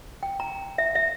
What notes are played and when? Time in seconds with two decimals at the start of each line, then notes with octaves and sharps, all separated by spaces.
0.23 G5
0.40 A#5
0.78 E5
0.95 E5